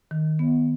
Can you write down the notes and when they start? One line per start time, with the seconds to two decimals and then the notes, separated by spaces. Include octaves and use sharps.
0.11 D#3
0.39 B3